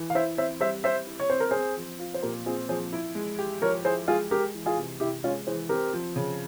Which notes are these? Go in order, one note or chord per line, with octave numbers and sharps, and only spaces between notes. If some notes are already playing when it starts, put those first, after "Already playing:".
Already playing: E3
F5
E4 C5 E5
C4 C5 E5
G3 C5 E5
G3 C5 E5
E4
C#5
C4 C5
A#4
C4 G#4 C5
F3
F4
C5
A#2 G4 A#4
C4 F4 G#4
F3 G#4 C5
E4
G#3
G4
F3 A#4 C#5
E4 G#4 C5
G#3 F4 G#4
G#3 G4 A#4
E3
F4 G#4
C3
C3 E4 G4
G#3 C#4 F4
E3 G#4 C5
C4 G4 A#4
F3
C#3